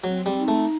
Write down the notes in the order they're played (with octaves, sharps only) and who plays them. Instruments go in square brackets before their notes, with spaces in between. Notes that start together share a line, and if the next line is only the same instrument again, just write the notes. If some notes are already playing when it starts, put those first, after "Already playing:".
[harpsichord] F#3 [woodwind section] C4
[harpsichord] G3
[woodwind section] D#4
[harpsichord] A3